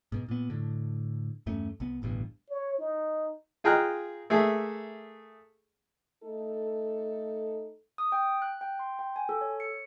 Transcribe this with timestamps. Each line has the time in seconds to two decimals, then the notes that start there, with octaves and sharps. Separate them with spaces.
0.12 G#2 B2
0.29 A#2 B3
0.50 A2 D3
1.46 E2 G2 A3 C#4
1.80 C2 B3
2.02 D1 A1 G2 B2
2.50 C#5
2.79 D#4
3.64 F4 G#4 G5 A#5 F6 F#6
4.30 A3 A#3 G#4 E5
6.24 A3 D#4 A4
7.98 D#6
8.12 G5
8.42 F#6
8.61 G5
8.79 C6
8.99 G5
9.16 G#5
9.29 A4
9.41 C#5
9.60 C#7